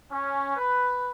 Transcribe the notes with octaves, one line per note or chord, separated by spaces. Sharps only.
C#4
B4